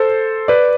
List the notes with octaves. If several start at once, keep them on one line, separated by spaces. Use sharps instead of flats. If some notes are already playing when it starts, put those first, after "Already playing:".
Already playing: A4 C5
B4 D5